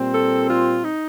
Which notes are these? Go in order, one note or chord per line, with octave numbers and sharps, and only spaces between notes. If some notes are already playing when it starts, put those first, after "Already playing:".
Already playing: A#2 G3 C4
A4
F4
D#4